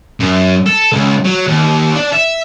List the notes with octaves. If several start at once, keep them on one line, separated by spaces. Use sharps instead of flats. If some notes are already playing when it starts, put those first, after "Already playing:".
F#2
A4
C#2
F#3
D#2
D4
E5